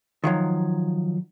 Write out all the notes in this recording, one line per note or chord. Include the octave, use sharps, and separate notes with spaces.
D#3 F3 F#3